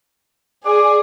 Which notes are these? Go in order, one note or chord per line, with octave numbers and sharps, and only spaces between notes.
G#4 D5